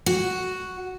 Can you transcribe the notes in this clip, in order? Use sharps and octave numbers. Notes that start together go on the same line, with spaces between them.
F#4